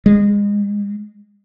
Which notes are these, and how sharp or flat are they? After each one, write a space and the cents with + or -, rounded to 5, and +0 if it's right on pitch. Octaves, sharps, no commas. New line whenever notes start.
G#3 -30